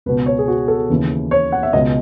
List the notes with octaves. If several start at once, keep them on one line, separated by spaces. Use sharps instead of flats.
C#2 B2 B4
C#5
G#4
F#4
A4
D#2 C#3 E3
C#5
F#5
E5
C#2 B2 D#5